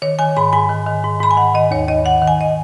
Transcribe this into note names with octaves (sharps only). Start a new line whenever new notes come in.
D#3 C#5
D#3 G#5
G#2 B5
G#2 G#5
D#3
D#3
G#2
G#2 B5
G#5
D#3 F#5
D#3 D#5
D#2 C#5
D#2 D#5
D#3 F#5
D#3
G#5
D#5